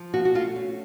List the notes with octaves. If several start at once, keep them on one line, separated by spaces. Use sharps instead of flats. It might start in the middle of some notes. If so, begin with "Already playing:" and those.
Already playing: F3
F4 F#4
F#4
A3 F4
C#4